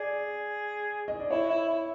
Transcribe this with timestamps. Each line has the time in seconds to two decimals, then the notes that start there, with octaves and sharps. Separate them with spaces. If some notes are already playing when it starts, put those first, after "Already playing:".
Already playing: G#4 D5
1.08 D#5
1.20 D5
1.30 E4 C#5
1.50 E4
1.69 E4